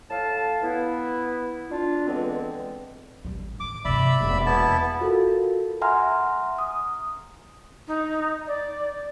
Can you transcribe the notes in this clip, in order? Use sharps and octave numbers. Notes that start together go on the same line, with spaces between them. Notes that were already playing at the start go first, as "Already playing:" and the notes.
A2 F5 A5
B3 E4
D4 F4
C#2 D3 E3 G#3 B3 C4
A1 G3
D#3 D6
G2 C3 D5 E5 B5
G#2
E1 A#3
B3 E4 A5
F4 F#4 A4 A#4
E5 F#5 G#5 A#5 C6 F6
D#6
D#4
D5